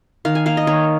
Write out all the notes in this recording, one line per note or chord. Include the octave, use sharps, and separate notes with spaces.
D#3 F5
G#5
A#3 F5
D#5
D#3 C#5